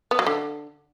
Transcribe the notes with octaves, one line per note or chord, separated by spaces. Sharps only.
B3
F#3
D3